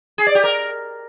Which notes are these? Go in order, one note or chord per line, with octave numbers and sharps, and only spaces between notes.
G#4
D5
G4
A#4